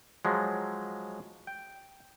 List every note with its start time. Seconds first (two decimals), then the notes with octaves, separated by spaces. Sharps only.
0.25 F3 F#3 G#3
1.47 G5